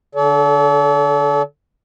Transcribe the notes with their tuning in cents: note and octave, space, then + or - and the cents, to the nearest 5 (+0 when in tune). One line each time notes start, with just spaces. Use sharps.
D3 +0 A4 -30 D5 -45